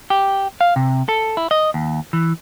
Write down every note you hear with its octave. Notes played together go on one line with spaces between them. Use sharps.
G4
F5
C3
A4
E4
D#5
D#2
E3